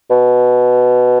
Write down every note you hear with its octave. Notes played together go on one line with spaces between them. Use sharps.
B2